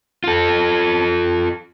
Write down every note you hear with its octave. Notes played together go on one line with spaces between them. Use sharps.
F4 A4